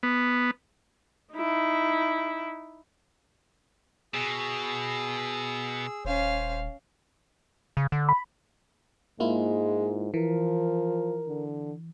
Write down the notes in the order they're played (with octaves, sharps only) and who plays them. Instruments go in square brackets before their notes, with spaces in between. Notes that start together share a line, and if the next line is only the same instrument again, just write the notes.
[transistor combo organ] B3
[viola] D#4 E4
[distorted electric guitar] B2 [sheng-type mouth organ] G#4 E6
[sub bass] D#1 [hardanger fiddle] C#4 F5 [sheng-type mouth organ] C5
[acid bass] C#3
D3
[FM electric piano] B5
[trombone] G#2 [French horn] G#3 [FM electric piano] A#3 E4 F4
[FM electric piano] E3 [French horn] F3 [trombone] A#4
[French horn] D3